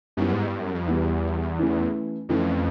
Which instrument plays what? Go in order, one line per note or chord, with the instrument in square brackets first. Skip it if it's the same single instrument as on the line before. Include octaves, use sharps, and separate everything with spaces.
[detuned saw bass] F#2 [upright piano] G3 B3 E4
[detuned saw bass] G#2
G2
F#2
F2
[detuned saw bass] E2 [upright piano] G3 B3 E4
[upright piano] E3 A3 C#4 E4
[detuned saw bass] F2 [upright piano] E3 A3 C#4 E4